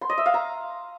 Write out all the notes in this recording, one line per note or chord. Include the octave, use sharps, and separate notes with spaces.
C6
D#5
E5
F5
A#5